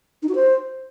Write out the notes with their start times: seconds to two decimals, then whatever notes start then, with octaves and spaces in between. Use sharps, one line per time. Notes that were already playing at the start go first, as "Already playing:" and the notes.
0.23 D#4
0.29 F#4
0.35 C5